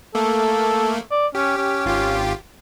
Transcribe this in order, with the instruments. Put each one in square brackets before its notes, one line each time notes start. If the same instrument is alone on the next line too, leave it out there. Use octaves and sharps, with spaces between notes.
[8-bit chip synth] A3 A#3 [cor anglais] A4
[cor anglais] D5
[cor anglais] C#4 [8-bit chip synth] G4
[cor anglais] C#4
[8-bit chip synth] G#1 F4 G4